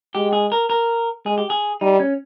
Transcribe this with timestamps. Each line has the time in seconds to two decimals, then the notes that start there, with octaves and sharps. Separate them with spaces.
0.15 G#3 G4
0.33 G#4
0.52 A#4
0.70 A#4
1.25 G#3 G#4
1.38 G4
1.50 G#4
1.81 G3 D#4
2.00 C#4